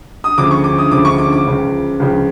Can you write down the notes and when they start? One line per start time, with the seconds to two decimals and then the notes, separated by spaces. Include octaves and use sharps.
0.24 D#6
0.38 D2 C#3 F3 D6
0.51 C#6
0.64 D6
0.78 D#6
0.91 D2 C#3 F3 D6
1.05 C#6
1.18 D6
1.33 D6
1.46 C#2 C#3 F3
2.00 C#2 C#3 F3